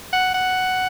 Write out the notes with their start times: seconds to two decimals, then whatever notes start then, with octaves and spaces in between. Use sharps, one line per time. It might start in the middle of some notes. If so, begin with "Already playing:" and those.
0.13 F#5
0.34 F#5